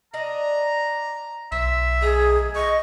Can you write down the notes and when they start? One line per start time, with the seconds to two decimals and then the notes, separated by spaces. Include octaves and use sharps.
0.14 D4 D#5 A#5
1.52 B1 C5 E5
2.02 A3 G#4 D#5 A#5
2.55 D#5 C#6